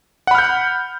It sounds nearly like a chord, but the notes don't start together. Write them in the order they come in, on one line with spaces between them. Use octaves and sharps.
F#5 B5 F6 G6